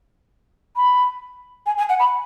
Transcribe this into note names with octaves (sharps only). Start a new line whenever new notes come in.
B5
G#5
G#5
F#5
B5